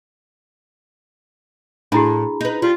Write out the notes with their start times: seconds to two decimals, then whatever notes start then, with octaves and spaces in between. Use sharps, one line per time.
1.92 A2 D4 E4 F#4 G#4 A#5 B5
2.41 D#4 B4
2.62 G3 F4